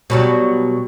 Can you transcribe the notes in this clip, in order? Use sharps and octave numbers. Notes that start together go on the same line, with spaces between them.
B2 F#3 G3